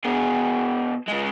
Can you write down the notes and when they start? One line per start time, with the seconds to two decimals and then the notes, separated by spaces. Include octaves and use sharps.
0.05 B2 G#4
1.08 C#3 G#3